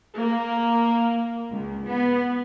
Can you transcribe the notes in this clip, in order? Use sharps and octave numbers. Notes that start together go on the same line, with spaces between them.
A#3
C#2
B3